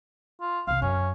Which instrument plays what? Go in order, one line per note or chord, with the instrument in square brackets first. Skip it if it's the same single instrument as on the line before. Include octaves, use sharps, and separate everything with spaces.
[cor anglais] F4
[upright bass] C2 C3 [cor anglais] F5
[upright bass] F#2 [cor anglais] C#4